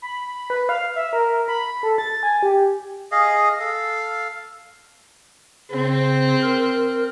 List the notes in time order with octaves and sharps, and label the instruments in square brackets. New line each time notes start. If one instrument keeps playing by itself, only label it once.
[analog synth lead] B5
B4
F5
E5
A#4
B5
A4
A6
G#5
G4
[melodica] G#4 D#5 F5
A4 F5
[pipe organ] C#3 [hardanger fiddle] C4
[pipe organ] A#4